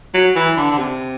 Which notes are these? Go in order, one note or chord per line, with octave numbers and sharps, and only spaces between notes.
F#3
E3
D3
D3
C3